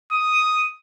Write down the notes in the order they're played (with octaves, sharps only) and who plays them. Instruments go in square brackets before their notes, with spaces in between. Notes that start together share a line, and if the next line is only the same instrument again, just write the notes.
[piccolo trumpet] D#6